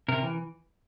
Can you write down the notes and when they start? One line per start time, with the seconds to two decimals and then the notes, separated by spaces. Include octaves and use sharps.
0.08 C3 A#4
0.23 E3